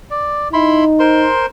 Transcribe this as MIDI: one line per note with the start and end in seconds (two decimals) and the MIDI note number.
0.11 0.48 74
0.53 1.29 63
0.53 0.84 64
0.53 0.84 83
0.53 0.84 84
1.00 1.46 70
1.00 1.46 72
1.00 1.46 84